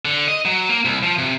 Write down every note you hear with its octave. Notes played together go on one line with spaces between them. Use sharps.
D3
D#5
F#3
A#3
C2
F3
C3